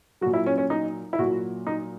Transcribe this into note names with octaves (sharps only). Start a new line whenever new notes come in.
A#2 F#3 F#4
E4
C#4
C#4
D#4
E4
A#2 F#3 F#4
D#4